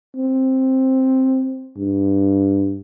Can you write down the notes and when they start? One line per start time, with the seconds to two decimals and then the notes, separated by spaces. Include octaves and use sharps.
0.16 C4
1.78 G2